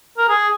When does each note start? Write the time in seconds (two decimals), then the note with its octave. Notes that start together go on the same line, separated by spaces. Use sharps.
0.18 A#4
0.29 G#4